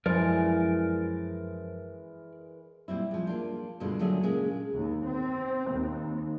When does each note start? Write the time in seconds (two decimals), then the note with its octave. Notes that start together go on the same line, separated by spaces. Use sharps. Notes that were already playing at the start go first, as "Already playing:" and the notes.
0.06 F#2 E3 F3 G#3 A#4 D5
2.88 A#2 G3 C4 E4
3.11 F3 G#3
3.27 A#3 D4 F4
3.80 G2 B2 D3 G#3 F4
3.99 D3 F#3 A3 D4 G#4
4.23 A#2 C#3 G#3 G#4 A#4 F5
4.73 D#2
5.05 C4
5.70 D#2